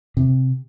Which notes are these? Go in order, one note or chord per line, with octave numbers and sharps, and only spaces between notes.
C3